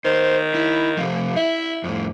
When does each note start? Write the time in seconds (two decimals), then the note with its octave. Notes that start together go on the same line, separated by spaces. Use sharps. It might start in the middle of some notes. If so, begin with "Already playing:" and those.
0.05 D#3 C5
0.55 E4
0.97 C3 F3 A3
1.37 E4 E5
1.84 F2 A2